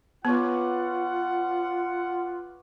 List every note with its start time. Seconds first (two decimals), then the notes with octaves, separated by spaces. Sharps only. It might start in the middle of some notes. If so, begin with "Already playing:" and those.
0.25 B3 F4 B4 C#5 D5 F#5